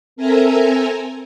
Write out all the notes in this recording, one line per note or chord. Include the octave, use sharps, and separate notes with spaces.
C4 A4 A#4 E5 G#5 A#5